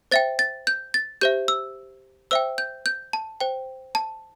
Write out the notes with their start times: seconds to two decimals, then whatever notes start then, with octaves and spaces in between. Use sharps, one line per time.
0.11 C5 E5 G5 A6
0.39 A6
0.67 G6
0.94 A6
1.21 G4 C5 E5 G6
1.48 E6
2.31 C5 E5 G5 E6
2.58 G6
2.86 G6
3.13 A5
3.41 C5 G5
3.95 A5